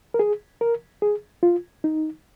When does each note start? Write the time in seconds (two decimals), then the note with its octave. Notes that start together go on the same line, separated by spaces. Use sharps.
0.14 A#4
0.19 G#4
0.61 A#4
1.02 G#4
1.43 F4
1.84 D#4